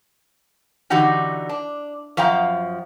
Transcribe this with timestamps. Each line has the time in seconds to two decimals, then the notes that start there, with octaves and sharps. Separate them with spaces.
0.90 D3 E3 D#4 F#4 G4
1.49 D4
2.17 F#2 F3 F5 G5 A#5